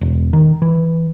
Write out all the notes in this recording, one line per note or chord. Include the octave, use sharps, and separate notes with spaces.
E1
D#3
E3